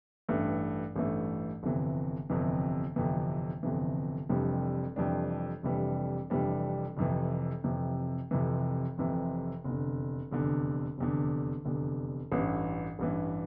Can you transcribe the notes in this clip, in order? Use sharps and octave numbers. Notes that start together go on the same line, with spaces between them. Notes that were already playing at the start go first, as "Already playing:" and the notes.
A1 G2 E3 A3
A1 G2 E3 A3
G1 F2 C3 E3
G1 F2 C3 E3
G1 F2 C3 E3
G1 F2 C3 E3
F1 F2 E3 G3 D4
F1 F2 E3 G3 D4
F1 F2 E3 G3 D4
F1 F2 E3 G3 D4
F1 F2 C3 E3
F1 F2 C3 E3
F1 F2 C3 E3
F1 F2 C3 E3
F1 E2 D3
F1 E2 D3
F1 E2 D3
F1 E2 D3
A1 G2 E3
A1 G2 E3